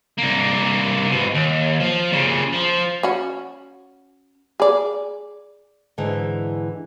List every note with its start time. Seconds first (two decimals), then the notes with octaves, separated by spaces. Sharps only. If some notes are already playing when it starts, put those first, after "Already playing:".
0.18 C2 A#3
1.11 G#2 B2
1.34 D#2
1.80 F3
2.12 A#2 C#3
2.53 F3
3.03 C#4 F#4
4.60 G#4 D5
5.98 G#2 D3 E3